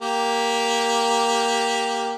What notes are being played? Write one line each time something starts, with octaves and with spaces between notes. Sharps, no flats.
A#3 G4